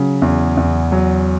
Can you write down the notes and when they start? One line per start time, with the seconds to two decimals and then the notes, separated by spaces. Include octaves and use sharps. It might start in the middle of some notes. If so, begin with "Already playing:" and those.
Already playing: C#3 F#3
0.22 E2
0.57 E2
0.92 F#3